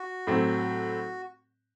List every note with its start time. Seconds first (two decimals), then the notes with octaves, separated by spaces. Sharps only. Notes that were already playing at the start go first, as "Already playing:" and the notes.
Already playing: F#4
0.27 A2 F#3 C4